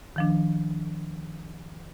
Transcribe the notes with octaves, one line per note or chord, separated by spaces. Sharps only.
D#3 F3 D4